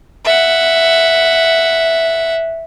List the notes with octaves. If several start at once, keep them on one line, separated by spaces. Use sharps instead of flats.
E5 F#5